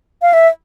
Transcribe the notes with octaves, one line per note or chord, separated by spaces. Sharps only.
F5
E5